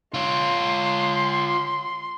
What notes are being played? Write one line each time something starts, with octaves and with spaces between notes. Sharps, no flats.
F4 C#5 C6